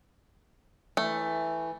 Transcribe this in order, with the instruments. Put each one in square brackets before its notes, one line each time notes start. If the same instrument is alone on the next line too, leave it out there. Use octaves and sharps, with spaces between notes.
[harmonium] E3 [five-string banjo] A3